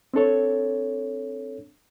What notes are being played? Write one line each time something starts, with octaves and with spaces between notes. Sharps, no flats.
C4 D4 A4 C#5